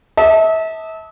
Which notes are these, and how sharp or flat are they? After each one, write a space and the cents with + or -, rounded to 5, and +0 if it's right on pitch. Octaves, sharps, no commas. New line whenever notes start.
E5 -35 A5 +0 D#6 -35